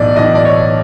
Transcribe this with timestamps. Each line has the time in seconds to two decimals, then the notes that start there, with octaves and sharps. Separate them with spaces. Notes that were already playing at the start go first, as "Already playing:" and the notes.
Already playing: B1 A2 E3 D5 D#5
0.16 B1 A2 E3 D#5
0.35 D5
0.45 C#5